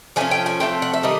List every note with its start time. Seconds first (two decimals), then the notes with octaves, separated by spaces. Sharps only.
0.16 F3 A3 C#4 G#5
0.31 G5
0.46 G#5
0.60 F3 A3 C4 G5
0.82 F#5
0.94 E5
1.03 D#3 G3 D#4 D#5